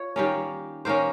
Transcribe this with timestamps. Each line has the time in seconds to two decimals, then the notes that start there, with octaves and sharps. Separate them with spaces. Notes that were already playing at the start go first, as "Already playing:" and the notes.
Already playing: F4 C#5
0.16 D#3 G3 A#3 C#4
0.85 D#3 A#3 C#4 C5